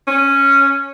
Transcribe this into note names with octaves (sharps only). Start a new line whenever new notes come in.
C#4